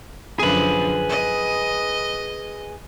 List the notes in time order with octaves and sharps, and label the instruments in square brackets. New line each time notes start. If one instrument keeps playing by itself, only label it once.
[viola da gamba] F#2 D3 F3 [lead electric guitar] G#4 B4
[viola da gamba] D#5